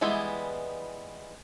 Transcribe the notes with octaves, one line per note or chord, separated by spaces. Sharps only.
E3 G3 G#3 B3 E4